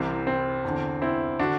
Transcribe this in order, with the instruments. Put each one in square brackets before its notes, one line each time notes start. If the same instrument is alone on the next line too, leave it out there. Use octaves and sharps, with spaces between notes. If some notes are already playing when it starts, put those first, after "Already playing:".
Already playing: [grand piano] C2 C3 E3 C4
C4
E2 D3
C4 E4
D3 D4 F#4